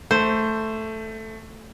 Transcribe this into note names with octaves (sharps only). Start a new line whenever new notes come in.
A3 C5